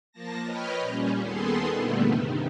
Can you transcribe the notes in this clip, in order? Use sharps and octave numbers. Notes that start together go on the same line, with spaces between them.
F3 A#3 A5 A#6
B4 C#5 D#5 G5 B5 F6
A#2 G3 C#4
D#2 D#3 B3 G#4 A4 C6
A#2 D3 G3 A3 B3
G2 C3 D#3